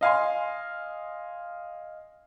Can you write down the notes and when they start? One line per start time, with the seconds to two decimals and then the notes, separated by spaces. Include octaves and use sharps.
0.01 D#5 F5 G#5 C6